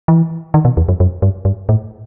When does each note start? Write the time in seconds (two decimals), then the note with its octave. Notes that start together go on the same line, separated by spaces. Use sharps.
0.08 E3
0.54 D#3
0.65 B2
0.77 E2
0.89 F#2
1.00 F#2
1.22 G2
1.45 G2
1.69 A2